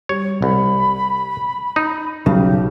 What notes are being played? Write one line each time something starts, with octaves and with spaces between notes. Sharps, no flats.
G3 C#5
C2 B5
D#4
B1 C#3 G4